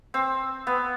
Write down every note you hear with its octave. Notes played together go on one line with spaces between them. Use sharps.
C4
B3